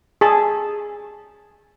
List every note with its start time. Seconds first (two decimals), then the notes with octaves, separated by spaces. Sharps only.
0.21 G#4 A5